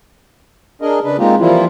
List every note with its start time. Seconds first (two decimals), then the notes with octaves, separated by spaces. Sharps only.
0.82 D4 G#4 A#4 D#5
1.04 C#3 D4 B4
1.19 G#3 A#3 C4 D#4 F4 G4
1.40 E3 F3 G3 A#3 E4 F4